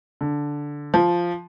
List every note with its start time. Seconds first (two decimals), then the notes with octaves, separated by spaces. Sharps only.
0.21 D3
0.94 F3